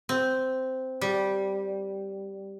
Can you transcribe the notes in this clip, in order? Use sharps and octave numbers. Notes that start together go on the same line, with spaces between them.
C4
G3